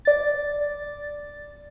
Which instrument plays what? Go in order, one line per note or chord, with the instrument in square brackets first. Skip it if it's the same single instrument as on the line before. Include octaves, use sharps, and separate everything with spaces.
[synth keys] D5 A6